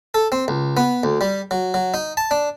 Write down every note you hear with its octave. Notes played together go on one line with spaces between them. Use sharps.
A4
C4
C#2
B3
D2
G3
F#3
F#3
D#4
A5
D4